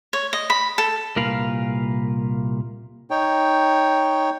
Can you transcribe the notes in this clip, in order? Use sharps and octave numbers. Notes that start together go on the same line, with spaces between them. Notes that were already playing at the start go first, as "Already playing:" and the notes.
C#5
D#5
B5
A4
C2 A#2 A#4 B4 F5 B5
D#4 C#5 G5